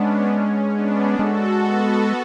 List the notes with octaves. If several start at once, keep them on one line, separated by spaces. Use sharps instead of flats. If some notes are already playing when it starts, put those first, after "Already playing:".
Already playing: G#3 B3 C#4 D4
B3 D4
G#3 F#4 A4
B3